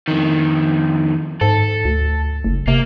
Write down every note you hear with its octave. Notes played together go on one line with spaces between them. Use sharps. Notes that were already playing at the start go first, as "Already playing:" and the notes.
F2 D#3
G#2 A4
D2
F#1
C3 A#3